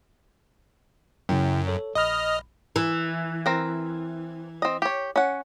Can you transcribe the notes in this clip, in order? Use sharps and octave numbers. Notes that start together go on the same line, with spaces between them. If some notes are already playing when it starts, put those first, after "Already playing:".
F#2 C#3 E4 G5
A4 C#5
A#1 D#5 B5 F6
E3
C4 A#4
C4 D#5
G4 C#5
C#4 F#5